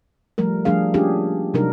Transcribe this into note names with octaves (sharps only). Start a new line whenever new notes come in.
F3 G3 A3 A#4
F3 G3 A3 D4 G#4 F5
A#3 C#4 D4 F4 G4 G#4
C3 F#3 G3 D4 D#4 A#4